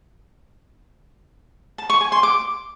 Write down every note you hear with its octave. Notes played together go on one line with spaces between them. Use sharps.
A5
C#6
G#5
C6
D6